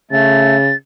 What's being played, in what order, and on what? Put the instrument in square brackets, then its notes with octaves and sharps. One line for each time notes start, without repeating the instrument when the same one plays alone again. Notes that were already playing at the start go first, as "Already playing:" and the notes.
[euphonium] C#3 [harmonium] A3 [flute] A6